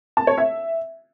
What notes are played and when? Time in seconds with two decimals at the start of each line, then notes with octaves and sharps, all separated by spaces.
0.17 A5
0.27 C#5
0.38 E5